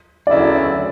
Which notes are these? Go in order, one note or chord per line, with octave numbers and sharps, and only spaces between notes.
D2 C#3 F#3 B3 E4 D5